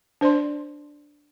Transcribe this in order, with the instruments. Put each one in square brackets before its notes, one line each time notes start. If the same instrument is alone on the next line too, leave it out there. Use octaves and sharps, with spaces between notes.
[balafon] D4 C5 D5 C6